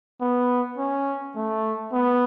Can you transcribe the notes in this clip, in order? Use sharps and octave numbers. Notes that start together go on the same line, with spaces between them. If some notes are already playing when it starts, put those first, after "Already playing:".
B3
C#4
A3
B3